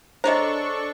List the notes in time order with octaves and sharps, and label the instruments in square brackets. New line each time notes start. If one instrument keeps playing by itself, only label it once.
[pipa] G#3 C#5 A#5 [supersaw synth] D4 A4 C#6 [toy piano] C5 D#5